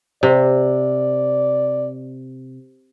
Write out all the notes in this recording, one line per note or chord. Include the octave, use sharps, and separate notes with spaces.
C3 D5